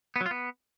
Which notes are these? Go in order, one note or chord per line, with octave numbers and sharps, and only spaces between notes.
B3
F#3
F4
B3